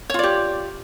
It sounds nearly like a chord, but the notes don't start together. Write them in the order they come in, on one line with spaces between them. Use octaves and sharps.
C#5 F4 D5 G4